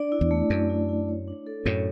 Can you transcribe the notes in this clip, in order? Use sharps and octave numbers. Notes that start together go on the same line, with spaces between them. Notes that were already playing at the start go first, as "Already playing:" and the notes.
Already playing: D4 D5
E4
E2
A3
F#2 D5
E4
E4
C#5
D4
A4
F#2 A2 C#5